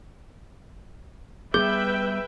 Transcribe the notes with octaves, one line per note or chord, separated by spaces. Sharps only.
G3 A3 B3 G#4 B4 E5 G5 G6